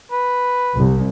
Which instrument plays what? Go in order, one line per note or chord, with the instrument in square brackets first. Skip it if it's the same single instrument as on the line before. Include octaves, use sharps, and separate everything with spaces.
[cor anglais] B4
[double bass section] C2